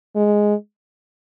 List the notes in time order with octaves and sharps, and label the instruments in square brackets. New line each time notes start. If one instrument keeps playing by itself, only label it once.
[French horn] G#3